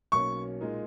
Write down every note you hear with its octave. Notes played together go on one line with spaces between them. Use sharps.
B1 B2 A#3 C#4 C#6
A#2 G#3 D#4 A#4